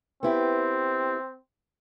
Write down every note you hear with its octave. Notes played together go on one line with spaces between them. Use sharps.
B3 C4 E4 G4